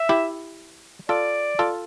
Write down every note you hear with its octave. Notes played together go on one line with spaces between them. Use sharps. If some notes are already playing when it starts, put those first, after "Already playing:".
Already playing: E5
E4 G4
F4 A4 D5
F4 A4